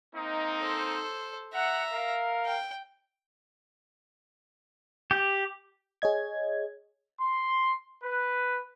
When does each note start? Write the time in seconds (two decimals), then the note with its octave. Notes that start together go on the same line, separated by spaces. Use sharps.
0.15 A#3 C4 D#4
0.59 A4 C5
1.54 E5 F#5 A#5
1.92 A#4 F5
2.45 G5
5.11 G4
6.02 G#4 C#5 D#5 G#6
7.20 C6
8.03 B4